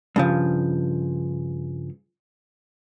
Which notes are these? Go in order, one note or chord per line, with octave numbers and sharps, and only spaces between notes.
G2 C#3 F3